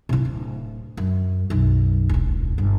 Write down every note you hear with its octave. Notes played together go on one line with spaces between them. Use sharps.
C3 E4
D1
F#2
B1 F#2
E1 C#2
G1